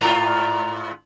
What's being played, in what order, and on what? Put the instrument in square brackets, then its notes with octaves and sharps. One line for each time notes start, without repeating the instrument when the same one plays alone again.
[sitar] G#2 F4 [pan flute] A#5